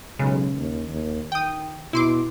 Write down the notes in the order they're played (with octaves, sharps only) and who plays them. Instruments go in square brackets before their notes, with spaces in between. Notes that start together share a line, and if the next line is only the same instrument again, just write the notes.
[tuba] B1 [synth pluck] C#3 G#3
[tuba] D#2
D#2
[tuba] D#3 [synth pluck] G5 D#6
[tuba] B2 [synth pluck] E4 C6 D6